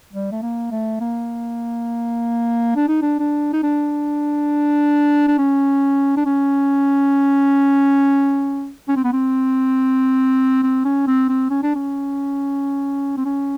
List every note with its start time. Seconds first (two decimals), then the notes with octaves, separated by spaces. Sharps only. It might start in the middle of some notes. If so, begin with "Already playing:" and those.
0.13 G3
0.32 A3
0.42 A#3
0.71 A3
1.00 A#3
2.76 D4
2.88 D#4
3.02 D4
3.19 D4
3.53 D#4
3.63 D4
5.28 D4
5.38 C#4
6.17 D4
6.26 C#4
8.88 C#4
8.96 C4
9.04 B3
9.13 C4
10.63 C4
10.85 C#4
11.07 C4
11.29 C4
11.50 C#4
11.63 D4
11.75 C#4
13.17 C4
13.26 C#4